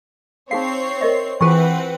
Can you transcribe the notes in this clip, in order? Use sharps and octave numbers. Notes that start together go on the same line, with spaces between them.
C4 D#4 G#4 C#5 F5 C7
A#4 D#5 E5
E3 C4 F4 G#4 B4 F#5 C#6